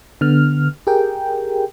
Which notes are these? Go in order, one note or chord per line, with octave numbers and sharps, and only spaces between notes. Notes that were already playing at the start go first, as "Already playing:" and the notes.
D3 B3 F6
G4 G#4 A#4 G5